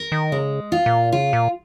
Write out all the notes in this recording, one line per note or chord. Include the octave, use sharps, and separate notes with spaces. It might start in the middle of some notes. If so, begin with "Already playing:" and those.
Already playing: A#4
D#3
C#3 G#3
F4
A#2
C#3 F4
A#2